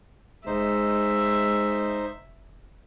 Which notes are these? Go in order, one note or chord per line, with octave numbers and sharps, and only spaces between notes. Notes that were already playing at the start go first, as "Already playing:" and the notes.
F1 G#3 D#4 C5 E5